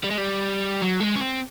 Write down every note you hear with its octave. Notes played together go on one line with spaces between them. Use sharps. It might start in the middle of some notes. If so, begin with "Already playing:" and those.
G3
G#3
G3
F#3
G#3
C#4
C4